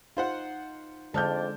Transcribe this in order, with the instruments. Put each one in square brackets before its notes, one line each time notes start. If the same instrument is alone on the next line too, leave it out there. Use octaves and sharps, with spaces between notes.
[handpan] D#4 [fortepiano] F4 C5 F#5
[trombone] F2 [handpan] D3 G#3 D5 [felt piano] A5 F6 G6